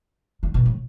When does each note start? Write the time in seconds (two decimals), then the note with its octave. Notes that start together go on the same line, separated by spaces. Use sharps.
0.43 D3
0.54 B2
0.66 A2